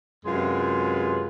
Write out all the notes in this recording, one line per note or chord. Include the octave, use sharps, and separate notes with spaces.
F#2 C3 G#3 F4 B4